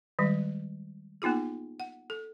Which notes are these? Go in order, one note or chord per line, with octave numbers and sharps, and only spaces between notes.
D#3 G3 G#3
A#3 B3 D#4 F4 G#4
F#5
A4